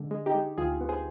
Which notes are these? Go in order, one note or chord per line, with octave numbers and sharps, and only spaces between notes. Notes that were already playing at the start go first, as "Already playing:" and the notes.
Already playing: D3 G#3
G#3
D#4 G4
G#3
D2 F4 G#4
B3
G#4 C5